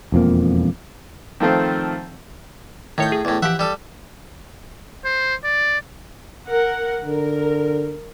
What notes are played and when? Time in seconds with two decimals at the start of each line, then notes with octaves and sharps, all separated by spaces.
0.12 E1 F2 F3 A#3
1.40 D#3 F3 A3 C4
2.98 A2 D#3 C#5 G6
3.12 G#4
3.25 E2 A2
3.42 E3 F3 G4 E5 F#5
3.59 G3 A4
5.05 C5
5.44 D5
6.46 A#4 F#5
7.04 D3 A#4